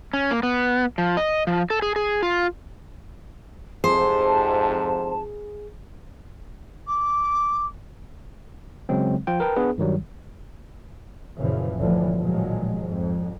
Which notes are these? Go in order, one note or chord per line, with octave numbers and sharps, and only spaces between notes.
C#4
A#3
B3
F3
D#5
F3
A4
G#4
G#4
F4
F2 G#2 C3 G#4 C5 A5
D6
C#3 F#3 G#3 C4
F3 F4 G5
A#4 B4 G5 A5
B3 D4 G#4 B4
G2 D#3 F#3 G3
F#2 A#2 C#3 E3 F3
G1 D2 A2 D3 E3 F3
A1 A#2 D#3 F3 F#3 G#3
F2 G#2